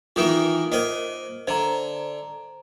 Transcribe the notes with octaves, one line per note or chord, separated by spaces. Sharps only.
D#3 E3 A#3 F4 D#6
A#3 A#4 C5 D#5 D#6
D3 C5 A#5